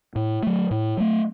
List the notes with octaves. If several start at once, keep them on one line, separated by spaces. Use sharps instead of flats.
A2
F#3 A3
A2
F#3 A3